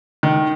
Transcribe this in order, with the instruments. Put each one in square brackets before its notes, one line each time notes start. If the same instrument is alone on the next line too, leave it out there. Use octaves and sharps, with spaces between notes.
[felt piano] D#3